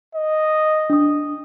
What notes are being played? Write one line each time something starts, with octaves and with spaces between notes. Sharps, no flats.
D#5
D4 D#6